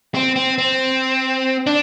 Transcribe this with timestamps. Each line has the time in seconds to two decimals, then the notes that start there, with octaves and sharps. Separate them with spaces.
0.15 C4
0.36 C4
0.58 C4
1.67 D4